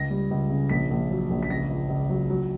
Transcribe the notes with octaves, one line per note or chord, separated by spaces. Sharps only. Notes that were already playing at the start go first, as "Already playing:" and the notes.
Already playing: C#2 A#6
G3
C#2
C#3
A#1 B6
A#1
F#3
A#1
B6
C#2 A#6
C#2
C#2
F#3
F#3